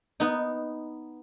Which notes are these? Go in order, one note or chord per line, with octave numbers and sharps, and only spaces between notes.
B3 D#4